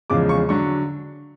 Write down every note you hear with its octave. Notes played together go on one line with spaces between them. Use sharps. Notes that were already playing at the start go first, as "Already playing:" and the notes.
E2 C#3 F3 G#3 D6
C#6
D3 F#3 C#6